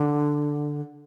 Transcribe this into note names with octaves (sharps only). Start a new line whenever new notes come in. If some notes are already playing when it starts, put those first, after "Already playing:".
Already playing: D3